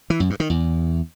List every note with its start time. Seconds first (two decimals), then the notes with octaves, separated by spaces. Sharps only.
0.10 E3
0.20 F#2
0.30 G2
0.40 D#3
0.50 E2